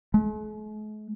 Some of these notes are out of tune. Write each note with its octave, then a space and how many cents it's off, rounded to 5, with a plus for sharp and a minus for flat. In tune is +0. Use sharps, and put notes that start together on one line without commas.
G#3 +45